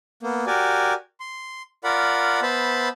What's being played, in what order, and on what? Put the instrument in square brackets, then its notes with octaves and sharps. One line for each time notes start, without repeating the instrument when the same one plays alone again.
[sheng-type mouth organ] A#3 B3
F#4 G4 A#4 D5 G#5
C6
F4 A#4 D5 F#5 B5
B3 C5 E5 A5 B5